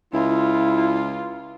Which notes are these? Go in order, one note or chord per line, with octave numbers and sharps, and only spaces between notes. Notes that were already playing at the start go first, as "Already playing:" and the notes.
C#2 E4 F4